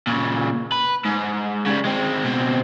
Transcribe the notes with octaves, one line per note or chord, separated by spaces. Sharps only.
A#2 C#3
B4
G#2
C#3 G3
G#3 C4
B2 C4